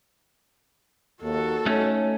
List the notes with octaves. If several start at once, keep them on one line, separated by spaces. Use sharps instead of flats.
D#2 A#3 F#4 A4
A3 C#4 D#4 C#5